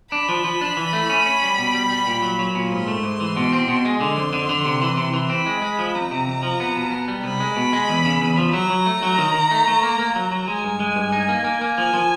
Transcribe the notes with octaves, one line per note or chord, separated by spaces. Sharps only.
D4 B5
F3
F3
D4
E3
A3
C#4
C#4
G3
B2
G3
G3
A#2
F#3
F#3
A#2
G#2 C6
A3
G#2
E3
B2
C4
B2
G#3
D3 C6
F2
D3
D3
C3
E3
C3
E3
C4 B5
G#3
G#3
F3
F2 A#5
C3
F2
F3
B3
B2
B3
G3
C2 B5
G#3
B2
G#3
E2
C#3
E2
F3
F#3 A#5
F#3
A3
F#3
D#3
D#3
A3
A3
A#3
A#3
F#3
F#3
G#3 G#5
G2
G#3
G2
D#4
A#3
A#3
A#3
F3 G#5
F3